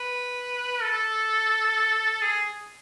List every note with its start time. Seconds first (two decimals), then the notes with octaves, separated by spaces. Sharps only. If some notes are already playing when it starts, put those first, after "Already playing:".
Already playing: B4
0.82 A4
2.22 G#4